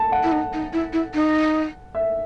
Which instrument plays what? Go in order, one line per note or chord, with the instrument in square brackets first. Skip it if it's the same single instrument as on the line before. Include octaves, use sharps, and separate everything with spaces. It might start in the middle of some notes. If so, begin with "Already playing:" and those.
Already playing: [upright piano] A5
F#5
[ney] E4
D#4
D#4
E4
E4
D#4
[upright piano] E5